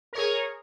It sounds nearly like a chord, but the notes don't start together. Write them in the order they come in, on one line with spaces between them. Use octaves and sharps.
A#4 C#5 G#4